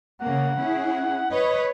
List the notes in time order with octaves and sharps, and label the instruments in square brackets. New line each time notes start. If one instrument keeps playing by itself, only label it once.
[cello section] C#3 A#3 [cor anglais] F#5
[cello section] C#4 E4 G#4
[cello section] B4 C#5 [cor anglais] D#5